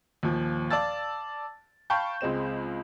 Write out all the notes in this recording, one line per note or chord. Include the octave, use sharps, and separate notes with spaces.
D#2 A#2 F3
D5 F5 A5 E6 A6
F5 G5 A5 B5 C#6 G6
C#2 G#3 C4 E7